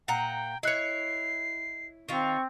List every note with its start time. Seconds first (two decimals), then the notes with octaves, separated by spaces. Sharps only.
0.08 A#2 F#5 G5 A#5
0.63 E4 C#5 D#5 F#6 C7 C#7
2.09 D#3 C4 F4 C#6